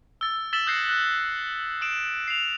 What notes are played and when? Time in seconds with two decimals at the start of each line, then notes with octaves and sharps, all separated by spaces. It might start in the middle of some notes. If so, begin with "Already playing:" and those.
0.21 E6 A6
0.53 E6 A6 B6 E7 F#7
0.67 D#6 F#6 G6 A#6 C7 C#7
0.84 F#6 F#7
1.81 D#6 C7 D7 E7
2.28 C7 E7 F7